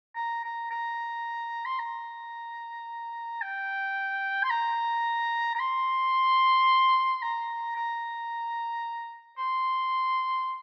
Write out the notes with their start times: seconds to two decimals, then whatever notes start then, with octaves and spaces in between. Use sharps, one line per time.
0.16 A#5
0.44 A#5
0.71 A#5
1.66 C6
1.79 A#5
3.42 G5
4.43 C6
4.50 A#5
5.55 A#5
5.60 C6
7.22 A#5
7.76 A#5
9.38 C6